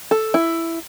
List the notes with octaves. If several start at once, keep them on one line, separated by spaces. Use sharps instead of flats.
A4
E4